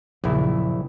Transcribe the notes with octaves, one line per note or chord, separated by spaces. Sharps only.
A#1 F#2 C#3 E4